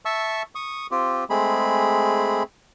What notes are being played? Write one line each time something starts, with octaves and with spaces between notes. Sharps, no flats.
E5 A5 C#6 E6
C#6 D#6
C4 F4 G4
G#3 A3 C4 G#4 B5